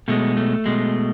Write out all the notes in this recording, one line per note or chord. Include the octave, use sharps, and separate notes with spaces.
B2 G#3 A3
A3
B2 G#3